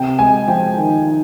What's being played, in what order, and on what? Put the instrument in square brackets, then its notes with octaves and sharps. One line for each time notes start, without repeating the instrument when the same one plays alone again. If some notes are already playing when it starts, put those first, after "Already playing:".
Already playing: [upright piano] C3 [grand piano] G5
[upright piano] G#3 [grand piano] G#5
[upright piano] F3 [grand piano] G5
[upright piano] D#3
D#4